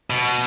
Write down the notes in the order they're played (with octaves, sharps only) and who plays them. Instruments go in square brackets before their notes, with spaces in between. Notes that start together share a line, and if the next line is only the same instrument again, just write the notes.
[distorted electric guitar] B2